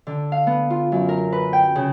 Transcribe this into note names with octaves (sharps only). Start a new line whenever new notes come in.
D3
F5
B3
F4
F#2
A#4
B4
G5
C#3